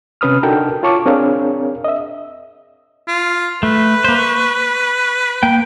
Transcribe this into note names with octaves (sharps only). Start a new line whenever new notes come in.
C3 C#4 B4 D#6 F6
D4 D#4 F#4 A4 A#4 G5
F4 C#5 A5 C#6 D6
C4 D4 G#4 A#4 C#5 F5
D#5 E5
F4
A3 B4
A#3 C5
C#6
A#3 G5